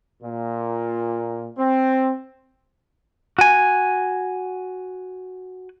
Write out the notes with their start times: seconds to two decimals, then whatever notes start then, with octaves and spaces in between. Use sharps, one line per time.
0.22 A#2
1.58 C4
3.39 F#4 G#5